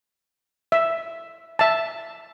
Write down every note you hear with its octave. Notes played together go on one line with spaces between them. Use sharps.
E5
E5 A5